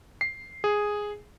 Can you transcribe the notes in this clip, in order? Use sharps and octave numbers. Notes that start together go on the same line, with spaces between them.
C7
G#4